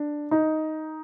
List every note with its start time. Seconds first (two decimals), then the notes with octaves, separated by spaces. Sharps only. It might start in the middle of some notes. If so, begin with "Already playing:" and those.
Already playing: D4
0.31 D#4